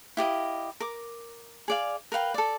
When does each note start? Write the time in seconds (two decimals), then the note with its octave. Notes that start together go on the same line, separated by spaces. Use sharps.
0.17 E4 G4 D#5 F5
0.80 A#4 D6
1.68 G#4 D5 F5
2.12 A#4 B4 F5 G5
2.34 A4 D5